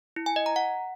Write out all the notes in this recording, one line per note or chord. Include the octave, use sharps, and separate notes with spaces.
E4
G#5
D#5
A#5
F#5